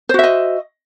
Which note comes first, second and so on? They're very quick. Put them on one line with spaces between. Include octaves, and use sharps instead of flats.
C5 F#4 E5 D#5